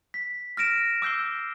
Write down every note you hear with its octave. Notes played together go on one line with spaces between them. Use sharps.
B6
F6 A#6 D7 E7
D6 E6 G6 C7 G7